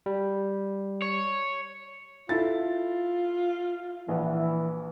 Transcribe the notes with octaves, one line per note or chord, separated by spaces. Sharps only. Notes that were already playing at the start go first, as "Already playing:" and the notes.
G3
C#5
E4 F4 A4 A6
A#1 E3 F#5